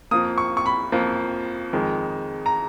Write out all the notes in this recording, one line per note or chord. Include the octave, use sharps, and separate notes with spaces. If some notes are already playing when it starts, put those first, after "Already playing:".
F2 F3 A#3 D#6
C#6
C#6
B5
F2 F3 A#3
F2 D#3 G#3
A#5